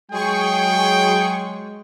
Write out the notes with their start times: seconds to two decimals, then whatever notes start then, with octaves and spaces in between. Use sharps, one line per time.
0.12 F#3 G#3 G#4 G5 C#6